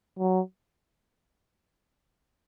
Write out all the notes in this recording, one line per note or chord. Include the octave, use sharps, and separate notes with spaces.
F#3